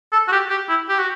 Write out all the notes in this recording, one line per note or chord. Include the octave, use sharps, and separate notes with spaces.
A4
F#4
G4
G4
E4
G4
F#4